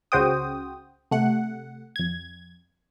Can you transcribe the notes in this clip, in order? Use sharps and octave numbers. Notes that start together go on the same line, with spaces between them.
C#2 C#3 F#4 C5 G5 D#6
C3 A3 F#5
F2 G#6